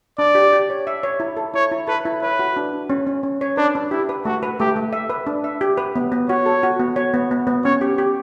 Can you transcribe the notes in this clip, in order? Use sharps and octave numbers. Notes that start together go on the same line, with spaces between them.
D4 D5
G4
G4
C#5
E5
C#5
E4
A4
E4 C#5
E4
A4 B4
E4
B4 C#5
F#4
D4
D4
C#4
C#4
C#4
C#5
D4 B4
D4
E4 G4
B4
A3 F#4
B4
A3 G4
A3
E5
B4
D4
E5
G4
B4
B3
B3
F#4 C#5
A4
F#4
B3
C#5
B3
B3
B3
C#4 C#5
G4
G4